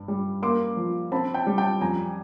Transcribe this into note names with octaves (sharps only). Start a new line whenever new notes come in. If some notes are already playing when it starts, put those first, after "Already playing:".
Already playing: G2
G3
A#3 C6 D6
F3
C4 A5 B5
G5 A5
G3
G5 A5
F2 G#5 A#5